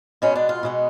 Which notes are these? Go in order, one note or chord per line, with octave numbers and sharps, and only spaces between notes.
B2 G#3 B3 C#4
D4
F4
B2 G#3 B3